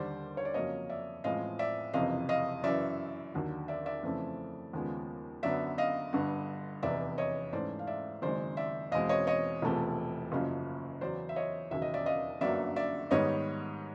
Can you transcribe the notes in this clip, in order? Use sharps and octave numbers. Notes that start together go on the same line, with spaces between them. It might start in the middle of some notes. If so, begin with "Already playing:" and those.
Already playing: D#2 D3 G3 C5 D5
C#5
D5
F2 C#3 F#3 A#3 C#4 C#5 D#5
D5 E5
A1 A2 F3 G#3 C4 D#5 F5
D5 E5
F#1 F2 C3 E3 D#5 F5
D#5 F5
F#2 C#3 E3 D5 E5
D#2 D3 F#3
D5 E5
D5 E5
F2 C#3 E3 A3 C4
D#2 C#3 F3 G#3 B3
F#2 D3 F#3 B3 D5 E5
D#5 F5
G1 G2 D3
F1 E2 C3 D5 E5
C#5 D#5
G#2 E3 A3 C#4 C5 D5
F5
D5 E5
F#1 F#2 D#3 G#3 C4 C5 D5
D5 E5
E2 B2 G#3 C4 D#5 F5
C#5 D#5
C#5 D#5
E1 E2 C3 F3 A3
F#1 F#2 C#3 F3 A#3
E2 C#3 F#3 C5 D5
E5
C#5 D#5
E1 D#2 C#3 F#3 E5
D#5
D5 E5
D#5 F5
G1 F#2 D3 F#3 A#3 D5 E5
D5 E5
G#2 D#3 G3 B3 C#5 D#5